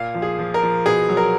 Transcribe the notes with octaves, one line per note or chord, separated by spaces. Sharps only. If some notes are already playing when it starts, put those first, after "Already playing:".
Already playing: A#2 F5
F3
G#4
F3
A#4
F3
B2 G#4
F#3
A#4